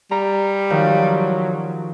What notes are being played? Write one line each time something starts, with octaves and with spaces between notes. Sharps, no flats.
G3 A#5
D#3 F3 F#3